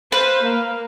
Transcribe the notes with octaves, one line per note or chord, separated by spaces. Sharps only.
B4 C5 F5
A#3 F5